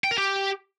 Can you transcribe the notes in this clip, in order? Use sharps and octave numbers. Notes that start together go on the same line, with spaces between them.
G5
A#4
G4